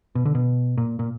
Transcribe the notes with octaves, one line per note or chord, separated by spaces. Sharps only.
B2
D3
B2
A#2
A#2